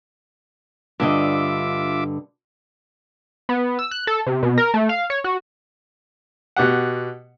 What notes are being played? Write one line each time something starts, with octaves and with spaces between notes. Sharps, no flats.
G2 D3 F4 D#5 E5 D6
B3
E6
F#6
A4
C3
B2
A#4
A3
F5
C#5
F#4
B2 G4 F#5